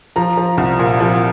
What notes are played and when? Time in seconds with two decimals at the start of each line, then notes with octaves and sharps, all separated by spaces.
0.16 F3 A#5
0.37 F3
0.58 C2
0.79 A#2
1.00 F3